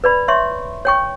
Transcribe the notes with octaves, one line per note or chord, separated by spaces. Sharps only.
B4 D5 B5
C#5 E5 C6 C#6
C#5 G5 C#6